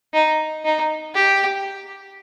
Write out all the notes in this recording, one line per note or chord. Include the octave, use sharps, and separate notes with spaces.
D#4
D#4
G4